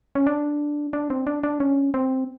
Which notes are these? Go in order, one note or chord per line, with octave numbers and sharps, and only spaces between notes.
C#4
D4
D4
C4
D4
D4
C#4
C4